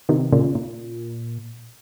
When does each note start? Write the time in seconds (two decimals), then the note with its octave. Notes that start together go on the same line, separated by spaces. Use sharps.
0.09 C3 D#3
0.33 A#2 C#3
0.55 A#2